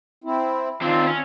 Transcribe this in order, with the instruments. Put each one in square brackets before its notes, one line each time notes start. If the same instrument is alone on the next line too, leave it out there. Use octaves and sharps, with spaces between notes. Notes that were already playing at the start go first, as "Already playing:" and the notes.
[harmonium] C4 E4
[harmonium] D#3 F4 [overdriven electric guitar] C4 D4
[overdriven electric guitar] C#4